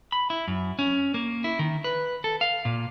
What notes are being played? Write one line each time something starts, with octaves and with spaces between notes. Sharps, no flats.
B5
E4
F#2
C#4
A#3
E4
D#3
B4
A4
F5
A#2